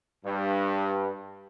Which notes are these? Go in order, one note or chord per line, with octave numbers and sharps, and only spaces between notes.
G2